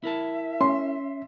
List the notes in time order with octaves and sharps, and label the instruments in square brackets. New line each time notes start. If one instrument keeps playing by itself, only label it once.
[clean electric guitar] E4 A#4 A5 [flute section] E5
[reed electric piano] C#4 [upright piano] C6